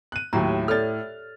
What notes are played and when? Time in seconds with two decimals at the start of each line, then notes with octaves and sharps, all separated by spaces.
0.12 F#6 D#7
0.33 D#2 A2 F#3 D4 G4 A#5
0.68 A4 C#5 D5 F6 A6